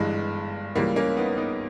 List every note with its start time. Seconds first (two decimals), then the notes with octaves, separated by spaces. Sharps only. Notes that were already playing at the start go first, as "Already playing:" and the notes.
Already playing: G1 G2 E3 G#3
0.75 C#2 C#3 E3 G3 A#3
0.96 A#3 C#4
1.17 B3 D#4
1.37 B3 D#4